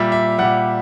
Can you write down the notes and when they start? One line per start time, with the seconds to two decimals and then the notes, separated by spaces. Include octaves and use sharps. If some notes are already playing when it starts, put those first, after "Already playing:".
Already playing: A#2 G3 E5
0.12 E5
0.38 A#2 G3 F#5